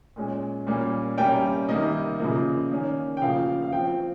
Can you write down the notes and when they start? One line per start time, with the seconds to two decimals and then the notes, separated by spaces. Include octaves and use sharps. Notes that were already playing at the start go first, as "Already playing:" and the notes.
0.16 A#2 G#3 C#4
0.67 A#2 G3 A#3 C#4
1.18 C3 G3 A#3 C#4 G5
1.69 C3 D#3 G3 A#3 D#5
2.20 C#3 F3 A#3
2.71 D#3 A#3 C#4
3.17 G5
3.22 C#3 F3 A#3 F5
3.62 F5
3.72 F3 C4 G5